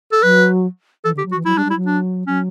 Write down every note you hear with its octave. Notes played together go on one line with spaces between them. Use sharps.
A4
F#3 B4
E3 A4
D3 G4
F#3
F#4
E3
F#3 E4
G3
D4
G3 E4
F#3
D4
F#3 C#4